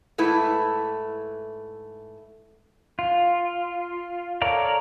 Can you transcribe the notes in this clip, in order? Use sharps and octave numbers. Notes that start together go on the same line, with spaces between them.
G#2 A3 E4 B4
F4
A4 A#4 C#5 D5 F5